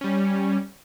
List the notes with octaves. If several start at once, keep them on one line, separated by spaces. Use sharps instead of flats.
G3 C#4